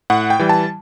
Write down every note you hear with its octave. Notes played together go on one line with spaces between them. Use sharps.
A2 F#5
G5
E3 G3
A5